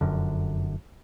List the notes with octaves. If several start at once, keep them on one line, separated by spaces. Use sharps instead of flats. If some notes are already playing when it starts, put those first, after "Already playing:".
F1 F#2 D3